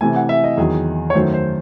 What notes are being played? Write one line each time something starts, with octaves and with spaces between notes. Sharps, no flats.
C3 E3 A3 G#5
F#5
E5
D#5
E2 D#3 F#3 G#4
C#5
F#2 D#3 F#3 A3 C5
C5